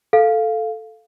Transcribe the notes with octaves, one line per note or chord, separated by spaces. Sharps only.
A4 F5